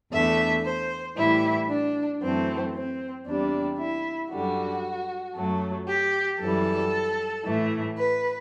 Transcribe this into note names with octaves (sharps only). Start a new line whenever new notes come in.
E2 D3 A3 E5
C5
A2 E3 G3 E4
D4
F#2 E3 A3 C4
C4
E2 C3 G3 D4
E4
F#2 D3 G3 F#4
F#2 F#3 A3
G4
F#2 E3 G3 A4
A2 E3 A3
B4